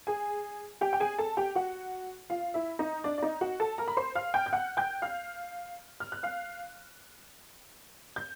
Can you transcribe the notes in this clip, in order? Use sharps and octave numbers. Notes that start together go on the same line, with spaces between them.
G#4 G#5
G4 G5
G5
G#4 G#5
A4 A5
G4 G5
F#4 F#5
F4 F5
E4 E5
D#4 D#5
D4 D5
D5
D#4 D#5
F#4 F#5
A4 A5
A#4 A#5
B5
C5 C6
F5 F6
G5 G6
G6
F#5 F#6
G5 G6
F5 F6
F6
F#6
F5 F6
G6